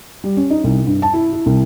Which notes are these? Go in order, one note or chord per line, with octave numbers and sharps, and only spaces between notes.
G3
C#4
D#4
C2
G2
A5
E4
E4
C2